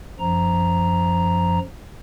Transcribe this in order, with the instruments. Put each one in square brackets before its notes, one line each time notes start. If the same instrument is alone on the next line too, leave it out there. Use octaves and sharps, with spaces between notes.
[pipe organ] F#2 F3 A#5